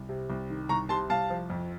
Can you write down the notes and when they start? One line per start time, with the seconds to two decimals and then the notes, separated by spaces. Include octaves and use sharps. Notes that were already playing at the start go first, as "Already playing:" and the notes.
Already playing: C2
0.09 C3
0.30 C2
0.50 D#3
0.69 C2 A#5 C#6
0.89 C3 A5 C6
1.10 C2 F5 A5
1.30 F3
1.50 F2